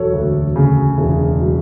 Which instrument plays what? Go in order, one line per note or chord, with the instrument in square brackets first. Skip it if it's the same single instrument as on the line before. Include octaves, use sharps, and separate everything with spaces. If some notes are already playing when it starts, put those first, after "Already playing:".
Already playing: [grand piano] E1 F#3 A4 C#5
D2
C#3
E1
F#3